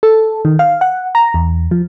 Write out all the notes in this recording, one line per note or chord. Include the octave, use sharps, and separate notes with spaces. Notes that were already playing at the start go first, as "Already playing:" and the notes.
A4
D#3
F5
F#5
A#5
E2
F3